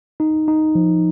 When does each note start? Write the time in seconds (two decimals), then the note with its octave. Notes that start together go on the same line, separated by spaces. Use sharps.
0.20 D#4
0.48 D#4
0.75 F3